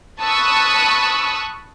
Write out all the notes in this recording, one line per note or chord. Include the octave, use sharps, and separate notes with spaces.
A5 B5 C#6 D#6 E6 F#6